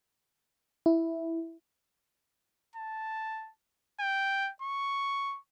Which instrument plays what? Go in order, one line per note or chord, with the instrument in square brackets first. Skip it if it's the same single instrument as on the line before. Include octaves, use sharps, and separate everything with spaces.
[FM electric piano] E4
[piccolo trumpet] A5
G5
C#6